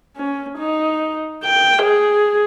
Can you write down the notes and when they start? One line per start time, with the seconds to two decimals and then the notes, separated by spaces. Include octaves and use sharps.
0.17 C#4
0.58 D#4
1.45 G5
1.83 G#4